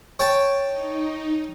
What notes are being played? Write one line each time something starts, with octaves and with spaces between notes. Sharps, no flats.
C#5 G5 A5
D#4